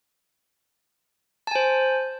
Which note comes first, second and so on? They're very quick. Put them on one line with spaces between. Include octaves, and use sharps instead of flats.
A5 G#5 C5